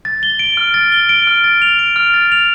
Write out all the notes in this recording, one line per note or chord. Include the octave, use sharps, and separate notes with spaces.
A6
G7
D7
F6
A6
G7
D7
F6
A6
F7
D7
F6
A6
F7